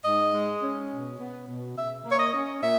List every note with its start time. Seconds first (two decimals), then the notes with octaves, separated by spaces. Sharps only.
0.03 G#2 D#5
0.33 G#3
0.61 C#4
0.90 B2
1.19 B3
1.48 B2
1.76 C#3 E5
2.04 A#3
2.10 C#5
2.18 D#5
2.33 C#4
2.61 A#2 E5